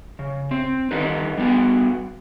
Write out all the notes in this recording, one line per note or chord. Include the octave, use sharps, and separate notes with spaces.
C#3
C4
D3 D#3 G3 D#4 B4
G3 B3 F#4